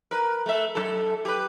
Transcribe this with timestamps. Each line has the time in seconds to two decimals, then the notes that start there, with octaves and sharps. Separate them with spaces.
0.11 A#4 B4
0.46 A3 E5
0.75 F#2 D#3 A4
1.25 G4 B4